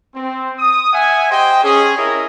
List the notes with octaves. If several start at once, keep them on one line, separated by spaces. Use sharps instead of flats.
C4
D#6
E5 F#5 G#5
G4 C5 D#5 G5
C#4 G#4
E4 G#4 A#4 C#5 D#5